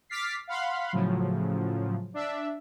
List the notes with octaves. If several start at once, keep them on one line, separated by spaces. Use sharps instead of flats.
D6 F6 A6 B6 C7
F5 F#5 B5 C6
A2 C#3 F3 F#3
D4 E5